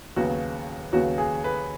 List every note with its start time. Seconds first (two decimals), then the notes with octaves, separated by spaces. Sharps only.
0.16 D#2 C#3 F#3 B3 F#4
0.93 D#2 C#3 F#3 B3 F#4
1.18 G#4
1.44 B4